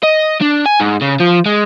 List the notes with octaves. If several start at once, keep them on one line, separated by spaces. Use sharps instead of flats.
D#5
D4
G#5
G#2
C#3
F3
G#3